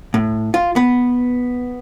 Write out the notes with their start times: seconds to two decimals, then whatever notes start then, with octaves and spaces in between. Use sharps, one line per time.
0.14 A2
0.54 F4
0.76 B3